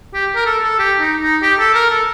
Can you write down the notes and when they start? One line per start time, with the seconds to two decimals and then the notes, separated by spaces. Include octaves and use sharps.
0.14 G4
0.35 A#4
0.46 A4
0.63 A4
0.79 G4
1.00 D#4
1.22 D#4
1.42 G4
1.59 A4
1.74 A#4
1.90 A4